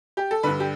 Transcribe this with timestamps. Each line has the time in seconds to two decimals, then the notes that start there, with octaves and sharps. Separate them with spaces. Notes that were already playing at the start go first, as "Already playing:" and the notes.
0.17 G4
0.31 A4
0.43 G2 D3 B4
0.60 G4